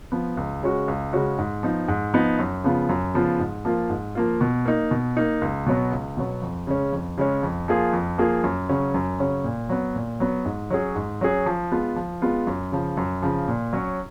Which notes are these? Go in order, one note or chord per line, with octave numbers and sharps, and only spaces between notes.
F3 B3
C#2
C#3 G#3 C#4 F#4
C#2
C#3 G#3 C#4 F#4
G#2
F3 B3 D#4
G#2
F3 B3 D#4
F#2
C#3 F3 B3 F4
F#2
C#3 F3 B3 F4
G#2
F3 A#3 F4
G#2
F3 A#3 F4
B2
A#3 D#4
B2
A#3 D#4
C#2
B2 F#3 B3
C#2
B2 F#3 B3
F2
C#3 G#3 C#4
F2
C#3 G#3 C#4
F2
F3 A#3 F4 G#4
F2
F3 A#3 F4 G#4
F#2
C#3 F#3 C#4
F#2
C#3 F#3 C#4
A#2
F#3 B3
A#2
F#3 B3
G#2
F#3 C#4 G#4
G#2
F#3 C#4 G#4
F3
G#3 B3 F4
F3
G#3 B3 F4
F#2
C#3 F3
F#2
C#3 F3
A#2
F#3 C#4